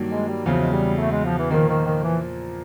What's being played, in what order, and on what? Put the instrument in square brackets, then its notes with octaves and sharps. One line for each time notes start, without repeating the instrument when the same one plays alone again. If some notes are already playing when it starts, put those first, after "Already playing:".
Already playing: [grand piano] G2 D#3 F#3 A#3
[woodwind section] G#3
G3
[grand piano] E2 C#3 F#3 [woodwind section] F3
[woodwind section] G#3
G3
A3
G#3
F3
E3
[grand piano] A#2 F3 A#3 [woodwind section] D#3
[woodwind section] D#3
D#3
E3